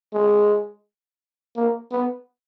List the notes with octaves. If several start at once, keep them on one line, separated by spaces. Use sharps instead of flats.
G#3
A#3
B3